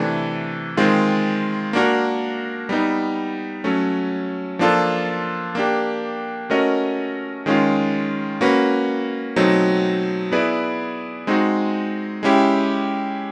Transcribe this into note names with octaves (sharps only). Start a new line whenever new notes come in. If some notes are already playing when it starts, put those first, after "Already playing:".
Already playing: C3 E3 A3 D4
D#3 G#3 C4 F4
A#3 D4 F#4 A#4
G3 B3 D#4
F#3 A3 C#4
F3 A#3 D4 F4 A4
A#3 D4 G4
A3 C#4 F#4 A#4 D#5
D#3 G#3 C#4 F4
A#3 C#4 F#4 B4
B2 F#3 A3 C4 D#4
B3 E4 G#4 B4 D5
G#3 C4 D#4 F#4
G#3 C#4 E4 G4